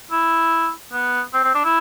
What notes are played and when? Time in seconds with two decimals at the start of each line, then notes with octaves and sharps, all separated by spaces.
0.12 E4
0.92 B3
1.34 C4
1.44 C4
1.54 D4
1.64 E4